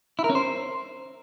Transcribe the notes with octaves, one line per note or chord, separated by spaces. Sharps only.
E4
A#4
C#4
C5